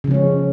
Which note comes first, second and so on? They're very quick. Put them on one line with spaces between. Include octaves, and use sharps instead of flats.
C#3 F3 C#4 G#3